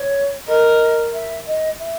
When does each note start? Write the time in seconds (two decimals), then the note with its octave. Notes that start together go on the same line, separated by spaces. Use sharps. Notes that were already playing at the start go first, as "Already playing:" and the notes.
Already playing: C#5
0.47 A#4 D#5
1.13 E5
1.47 D#5
1.79 E5